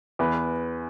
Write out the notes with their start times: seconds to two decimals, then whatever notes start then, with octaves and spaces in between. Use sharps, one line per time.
0.19 E2 B4